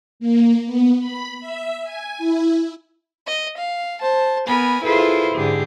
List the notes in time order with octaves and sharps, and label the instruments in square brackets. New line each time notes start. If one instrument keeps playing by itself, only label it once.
[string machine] A#3
B3
B5
E5
G#5
E4
[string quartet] D#5
F5
C5 A5
B3 A#4 G#5 B5
E4 F4 G#4 A4 B4 C5
G#2 D3 G4 G#4